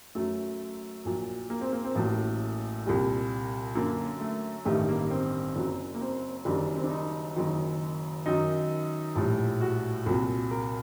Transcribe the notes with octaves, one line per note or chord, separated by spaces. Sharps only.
F#2 F#3 A3
A#1 A#2 F#3
A#3
C4
A#3
C4
A1 A2 F#3 A#3
C2 A#2 G3
F#2 D3 F#3 A#3
A3
A1 G2 D#3 G3 A3
A#3
C4
F#1 F#2 F#3
A#3
C4
F#1 F#2 D#3 G3 D4
C4
D4
D#4
F#1 F#2 D#3 F#3
F#2 D#3 F#3 D#4
A#1 A2 G3
F#4
C2 A#2 F#3
A#4